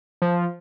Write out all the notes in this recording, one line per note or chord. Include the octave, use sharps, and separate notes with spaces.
F3